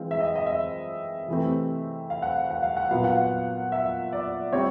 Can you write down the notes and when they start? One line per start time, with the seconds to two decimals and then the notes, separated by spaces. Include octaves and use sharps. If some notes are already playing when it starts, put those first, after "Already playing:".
Already playing: E3 G#3 C4 F5
0.11 E5
0.20 D#5
0.36 D#5
0.47 E5
1.28 C3 E3 A3 C4
2.10 F5
2.22 F#5
2.36 F5
2.51 F#5
2.63 F5
2.77 F#5
2.91 A#2 F#3 B3 F5
3.04 F#5
3.17 F5
3.72 E5
4.13 D5
4.53 G3 C4 C#5